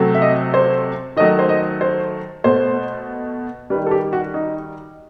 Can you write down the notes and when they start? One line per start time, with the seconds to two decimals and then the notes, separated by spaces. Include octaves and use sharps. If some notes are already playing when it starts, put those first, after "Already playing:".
Already playing: C3 F#3 A3
0.15 E5
0.22 D#5
0.54 C5
1.16 D#3 F#3 A3 D#5
1.39 C5
1.49 D#5
1.81 C5
2.44 B2 A3 C5
3.70 D#3 G3 B4
3.87 A4
3.91 G4
4.13 F#4
4.34 D#4